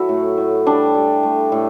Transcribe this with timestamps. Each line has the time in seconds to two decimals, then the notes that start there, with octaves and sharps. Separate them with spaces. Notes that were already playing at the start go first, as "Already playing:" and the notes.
Already playing: F#3 A3 E4 F#4
0.09 A2
0.38 A2
0.66 G3 D4
0.95 G3
1.23 A3
1.52 A2